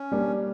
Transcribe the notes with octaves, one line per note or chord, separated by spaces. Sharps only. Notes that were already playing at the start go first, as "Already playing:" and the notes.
Already playing: C#4
G3 A#3 D4